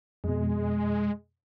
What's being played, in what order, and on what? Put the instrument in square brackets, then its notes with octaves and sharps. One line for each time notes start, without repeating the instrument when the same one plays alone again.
[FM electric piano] F2 B2 [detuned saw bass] G#3